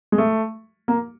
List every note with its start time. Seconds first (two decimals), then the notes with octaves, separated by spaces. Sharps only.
0.12 G#3
0.18 A3
0.88 A#3